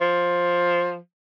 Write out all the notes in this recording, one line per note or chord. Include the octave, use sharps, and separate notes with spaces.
F3